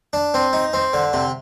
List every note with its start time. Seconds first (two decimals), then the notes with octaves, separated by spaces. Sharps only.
0.13 D4
0.34 C4
0.53 D#4
0.73 C4
0.93 D3
1.13 C3